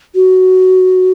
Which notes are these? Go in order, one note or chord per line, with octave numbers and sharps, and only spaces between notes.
F#4